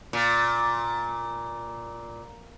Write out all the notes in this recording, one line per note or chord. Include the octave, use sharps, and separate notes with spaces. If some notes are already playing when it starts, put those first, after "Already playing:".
A#2